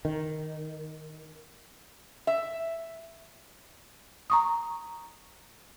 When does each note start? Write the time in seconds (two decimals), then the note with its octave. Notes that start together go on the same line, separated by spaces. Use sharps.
0.05 D#3
2.27 E5
4.30 A#5 C#6 D#6